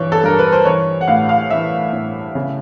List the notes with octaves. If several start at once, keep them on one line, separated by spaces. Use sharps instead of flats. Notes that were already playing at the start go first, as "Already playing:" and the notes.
Already playing: G2 E3 C#5
A4
G2 A#4
B4
C5
E3 C#5
F#5
A2 F5
F5
E3 E5
A2
C#3